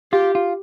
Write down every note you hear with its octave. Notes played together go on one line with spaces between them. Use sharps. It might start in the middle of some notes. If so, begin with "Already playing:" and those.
F4 G4
F4